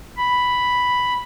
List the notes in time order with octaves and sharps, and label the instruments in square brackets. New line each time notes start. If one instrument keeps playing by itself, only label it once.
[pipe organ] B5